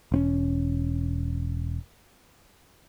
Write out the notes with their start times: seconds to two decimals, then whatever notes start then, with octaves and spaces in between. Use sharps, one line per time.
0.12 E1 C4 C#4